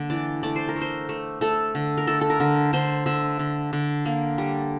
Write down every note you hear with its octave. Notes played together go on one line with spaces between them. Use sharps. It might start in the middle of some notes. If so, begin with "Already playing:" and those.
Already playing: D3 A#3
E3 D5
A3 D5
C5
A#4
A3
C5
A3
A3 A4
D3
A#4
A3 A4
A4
A#4
D3
D3 C5
D3 E5
D3
D3
A#3
G3